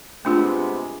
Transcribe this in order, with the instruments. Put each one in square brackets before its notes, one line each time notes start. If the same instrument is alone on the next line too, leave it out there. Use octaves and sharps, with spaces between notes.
[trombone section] C3 G#3 B3 [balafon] A3 D4 F4